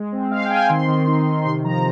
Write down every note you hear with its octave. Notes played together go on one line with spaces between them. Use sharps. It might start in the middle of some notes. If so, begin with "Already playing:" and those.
Already playing: G#3
C4
G#3 F5
G5
C4 G#5
D#3 C6
D#3
D#4
D#3
C3 C6
F3 A#5